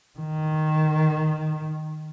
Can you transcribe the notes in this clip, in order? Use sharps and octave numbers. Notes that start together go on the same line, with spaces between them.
D#3